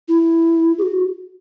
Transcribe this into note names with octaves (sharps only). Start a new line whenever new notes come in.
E4
G#4
F#4